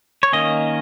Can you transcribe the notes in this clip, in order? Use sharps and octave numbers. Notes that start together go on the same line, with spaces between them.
C#5
D#3 A#3 C#4 D#5